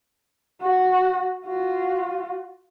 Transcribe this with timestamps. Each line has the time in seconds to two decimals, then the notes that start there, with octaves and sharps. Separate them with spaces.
0.61 F#4 F#5
1.46 F4 F#4